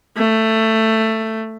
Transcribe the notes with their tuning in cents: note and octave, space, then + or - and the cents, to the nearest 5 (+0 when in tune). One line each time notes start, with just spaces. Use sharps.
A3 +10